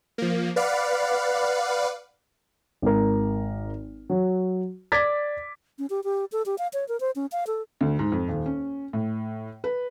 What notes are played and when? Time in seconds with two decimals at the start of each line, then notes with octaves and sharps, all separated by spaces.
0.18 F3 A#3
0.56 B4 D5 F5 F#5
2.82 G#1 A#4
4.10 F#3
4.92 D5 D6 G#6 A6 B6
5.79 C#4
5.90 G4
6.04 G4
6.32 A4
6.46 G4
6.58 F5
6.73 C#5
6.88 A#4
7.00 C5
7.16 C#4
7.32 F5
7.47 A4
7.81 D2
7.99 G#2
8.12 F2
8.28 D#1
8.46 C#4
8.93 A2
9.64 B4